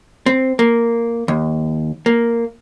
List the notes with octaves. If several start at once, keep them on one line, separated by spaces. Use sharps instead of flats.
C4
A#3
D#2
A#3